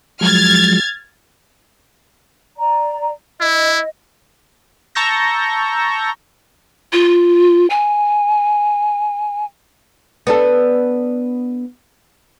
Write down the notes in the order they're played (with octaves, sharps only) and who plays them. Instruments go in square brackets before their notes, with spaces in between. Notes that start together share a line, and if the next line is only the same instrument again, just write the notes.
[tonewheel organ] F3 F#3 G#3 [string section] F6 G#6 A6
[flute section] D5 A#5
[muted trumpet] E4 [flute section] D#5
[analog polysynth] A5 A#5 C#6 E6 G6 A#6
[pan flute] F4
G#5
[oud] B3 D4 A4